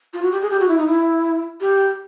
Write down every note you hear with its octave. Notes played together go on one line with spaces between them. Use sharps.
F4
F#4
G4
G#4
G4
F#4
E4
D#4
E4
G4